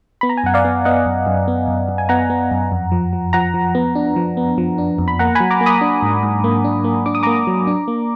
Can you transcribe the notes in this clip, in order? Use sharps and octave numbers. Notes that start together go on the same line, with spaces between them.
B3 B5
A#5
G#5
F#2 F#5
D5 F5
B3
B3 D#5 F#5
F#2
F#2
B3
F#2
F#2
G#5
B3 F#5 A#5
B3
F#2
F2
F3
F3
F3 F#5 A#5
F3
B3
D4
F3
B3
F3
D4
F2
B5
A#3 F#5 A#5
F#3 G#5 B5
A#5 D6
A#3
B5 D#6
D4
G#2
G#2
A#3
D4
A#3
D4 D6
D#6
A#3 A#5 D6
F#3
D4
A#3